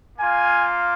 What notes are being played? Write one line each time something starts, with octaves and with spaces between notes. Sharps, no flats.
A#3 F4 G#5